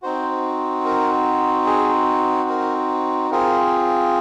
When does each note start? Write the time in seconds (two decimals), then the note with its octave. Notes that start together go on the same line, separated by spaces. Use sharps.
0.02 C4 D#4 F#4 C5
0.85 A#4
1.66 G#4
2.49 A#4
3.31 C4 F4 G#4 A#4